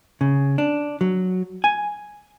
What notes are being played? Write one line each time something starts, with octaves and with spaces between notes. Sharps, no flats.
C#3
D4
F#3
G#5